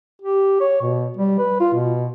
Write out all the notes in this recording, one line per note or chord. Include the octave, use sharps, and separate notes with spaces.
G4
C#5
B2
G3
B4
F4
B2